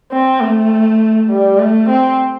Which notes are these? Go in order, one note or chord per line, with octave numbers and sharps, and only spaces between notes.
C4
A3
G3
A3
C4